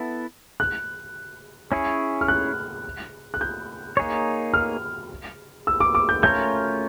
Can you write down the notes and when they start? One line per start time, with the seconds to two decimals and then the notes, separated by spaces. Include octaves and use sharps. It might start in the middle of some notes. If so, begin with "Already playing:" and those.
Already playing: B3 E4 A4
0.60 F#6
1.72 C#4 E4 G#4 C#5
2.21 F6
2.28 F#6
3.34 F#6
3.41 G6
3.97 A#3 D#4 G#4 C#5
4.54 F6
5.67 E6
5.80 D6
5.95 D6
6.09 G6
6.23 A3 C#4 F4 A#4 C#5 G6